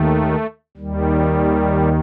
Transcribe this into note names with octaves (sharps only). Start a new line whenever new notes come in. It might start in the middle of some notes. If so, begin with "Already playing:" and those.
Already playing: D#2 D#3 A3
D#2 D#3 G3